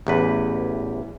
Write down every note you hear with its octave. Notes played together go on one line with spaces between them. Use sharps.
A1 E2 B4